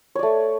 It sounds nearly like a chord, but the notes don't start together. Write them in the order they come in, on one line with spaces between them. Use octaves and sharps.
C#5 D5 A3